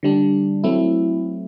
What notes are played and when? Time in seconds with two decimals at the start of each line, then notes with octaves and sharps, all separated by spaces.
0.03 D3 G3 D4
0.64 F#3 A3 C4 E4